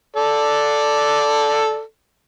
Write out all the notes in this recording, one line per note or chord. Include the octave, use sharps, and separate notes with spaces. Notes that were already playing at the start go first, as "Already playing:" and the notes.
A4 D5